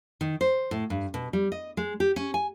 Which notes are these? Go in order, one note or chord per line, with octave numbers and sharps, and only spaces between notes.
D#3
C5
A2
G2
B2
G3
D#5
G#3
G4
C#4
G#5